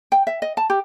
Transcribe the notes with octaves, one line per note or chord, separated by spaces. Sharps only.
G5
E5
D#5
A5
G4